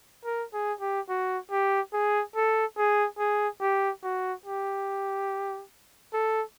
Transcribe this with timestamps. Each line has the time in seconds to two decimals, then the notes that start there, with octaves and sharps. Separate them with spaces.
0.25 A#4
0.53 G#4
0.81 G4
1.09 F#4
1.51 G4
1.93 G#4
2.36 A4
2.77 G#4
3.19 G#4
3.61 G4
4.04 F#4
4.45 G4
6.13 A4